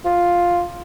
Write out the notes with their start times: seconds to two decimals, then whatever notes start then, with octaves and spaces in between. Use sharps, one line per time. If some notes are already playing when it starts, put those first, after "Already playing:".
0.05 F4